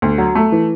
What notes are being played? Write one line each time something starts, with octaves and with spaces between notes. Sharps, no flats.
D2
F#3
A3
E3